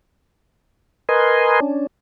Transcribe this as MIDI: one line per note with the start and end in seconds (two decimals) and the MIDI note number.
1.09 1.60 70
1.09 1.60 71
1.09 1.60 75
1.09 1.60 80
1.09 1.60 84
1.60 1.87 61
1.60 1.87 62